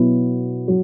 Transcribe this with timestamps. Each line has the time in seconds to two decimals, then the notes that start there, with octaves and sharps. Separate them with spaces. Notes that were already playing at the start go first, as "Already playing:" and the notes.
Already playing: B2 F#3 B3 E4
0.68 F#3